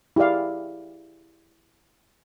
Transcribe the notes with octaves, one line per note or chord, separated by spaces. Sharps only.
E4 G4 G#4 D5 F5